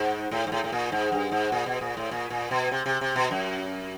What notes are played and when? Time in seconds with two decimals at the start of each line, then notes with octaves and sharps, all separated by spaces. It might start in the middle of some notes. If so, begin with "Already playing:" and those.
Already playing: G#2
0.31 A2
0.47 G#2
0.52 A2
0.64 A2
0.72 A#2
0.92 G#2
1.12 G2
1.31 G#2
1.52 A#2
1.66 B2
1.81 A#2
1.97 A2
2.11 A#2
2.30 A#2
2.51 B2
2.71 C3
2.86 C3
3.01 C3
3.16 B2
3.31 F#2